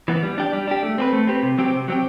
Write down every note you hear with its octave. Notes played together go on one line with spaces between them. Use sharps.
E3 B3
G3
D4 G4
G3
D4 G4
A3
C4 G4 B4
A3
C4 G4 B4
C3
F#3 C4 G4
C3
F#3 C4 G4